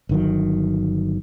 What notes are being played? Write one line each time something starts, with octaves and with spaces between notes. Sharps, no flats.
G1 D#3 F#3